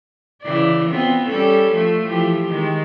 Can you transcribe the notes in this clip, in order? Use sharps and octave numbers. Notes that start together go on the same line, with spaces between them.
C#3 E3 D5
B3 C4 F4
G3 C#4 A4
F3 A3
E3 F3 G4
D#3 G#3